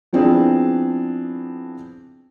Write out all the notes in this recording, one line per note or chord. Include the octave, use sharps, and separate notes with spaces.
F3 B3 C4 D4 E4 G#4